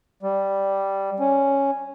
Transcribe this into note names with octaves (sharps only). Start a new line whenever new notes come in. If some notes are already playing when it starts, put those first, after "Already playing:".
G3
C#4